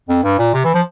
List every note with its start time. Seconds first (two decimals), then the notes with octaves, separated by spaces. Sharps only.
0.09 F2
0.24 G2
0.39 A#2
0.54 C3
0.64 E3
0.74 F3